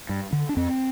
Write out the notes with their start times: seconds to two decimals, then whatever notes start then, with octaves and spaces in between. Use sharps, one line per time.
0.09 G2
0.33 D3
0.49 D4
0.57 F2 C4